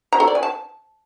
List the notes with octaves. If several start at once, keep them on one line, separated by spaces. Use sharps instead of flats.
A#5
A4
D5
G#5
A5